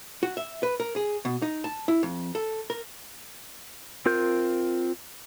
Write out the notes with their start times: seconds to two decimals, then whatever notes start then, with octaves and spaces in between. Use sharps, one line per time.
0.23 F#4
0.37 E5
0.63 B4
0.80 A#4
0.96 G#4
1.25 B2
1.42 D#4
1.64 A5
1.88 E4
2.03 F2
2.35 A4
2.70 A#4
4.06 C4 F4 A#4 G6